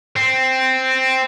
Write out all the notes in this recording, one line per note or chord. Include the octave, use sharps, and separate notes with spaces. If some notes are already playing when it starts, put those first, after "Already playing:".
C4